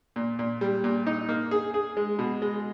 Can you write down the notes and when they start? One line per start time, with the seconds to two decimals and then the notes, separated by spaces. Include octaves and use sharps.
0.16 A#2
0.39 A#2
0.61 G3
0.84 A#2
1.07 D#4
1.29 A#3
1.51 G#4
1.74 G#4
1.97 G#3
2.19 B2
2.42 G#3